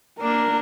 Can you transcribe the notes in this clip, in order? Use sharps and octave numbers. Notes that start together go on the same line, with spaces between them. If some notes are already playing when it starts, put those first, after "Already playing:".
A#3 D4 A#4